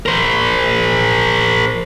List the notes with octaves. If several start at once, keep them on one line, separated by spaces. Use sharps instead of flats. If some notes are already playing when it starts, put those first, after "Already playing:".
A#4 C5